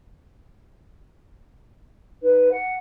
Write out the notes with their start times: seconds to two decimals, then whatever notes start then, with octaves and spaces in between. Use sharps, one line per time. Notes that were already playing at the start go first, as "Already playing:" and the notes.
2.22 D#4 B4
2.50 F#5